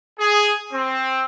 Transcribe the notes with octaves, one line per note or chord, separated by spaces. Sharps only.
G#4
C4